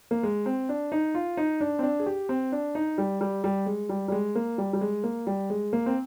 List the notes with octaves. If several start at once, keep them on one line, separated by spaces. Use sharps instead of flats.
A#3
G#3
C4
D4
D#4
F4
D#4
D4
C4
D4
G#4
G4
C4
D4
D#4
G3
G3
G3
G#3
G3
G3
G#3
A#3
G3
G3
G#3
A#3
G3
G#3
A#3
C4